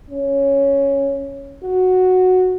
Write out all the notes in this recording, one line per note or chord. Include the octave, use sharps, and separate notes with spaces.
C#4
F#4